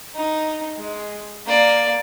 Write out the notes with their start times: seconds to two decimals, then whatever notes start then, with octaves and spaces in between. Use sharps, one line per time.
0.15 D#4
0.77 G#3
1.46 A#3 D5